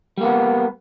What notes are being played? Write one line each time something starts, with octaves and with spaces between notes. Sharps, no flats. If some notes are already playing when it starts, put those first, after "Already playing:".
G3 A#3 B3